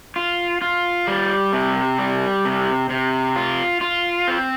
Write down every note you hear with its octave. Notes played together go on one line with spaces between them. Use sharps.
F4
F4
G3
C3
G3
C3
C3
F4
F4
C4